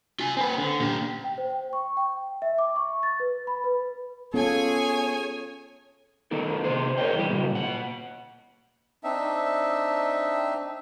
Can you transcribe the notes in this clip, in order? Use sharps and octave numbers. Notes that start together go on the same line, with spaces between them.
F4 G#5
C4 B4
D3
A#2 G4
G5
C5
G5
C#6
G5
E5
D6
C#6
A6
B4
B5
B4
B3 C#4 F4 G#4 A4 C#5 G#5
D#3 A3 D#4 A4 A#4
C3 G#4 C5
G#4 A#4 C5 C#5 D#5 G5
E2 E3 G3 G4
A#2 C#3 F#3 G3
A#2 F#5
C4 D4 D#4 E5